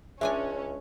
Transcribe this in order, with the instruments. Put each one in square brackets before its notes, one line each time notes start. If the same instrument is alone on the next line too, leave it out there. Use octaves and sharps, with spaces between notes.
[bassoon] C#2 [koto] G#3 D4 G#5 [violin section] C#4 [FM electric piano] E5